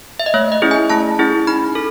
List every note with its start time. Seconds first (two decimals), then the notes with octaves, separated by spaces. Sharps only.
0.20 E5
0.26 D#5
0.34 A3 C#5
0.52 D#5
0.62 C#4 E4 G#4
0.71 G#5
0.90 A3 A5
1.19 C#4 E4 G#4
1.47 D#4 B5
1.75 A4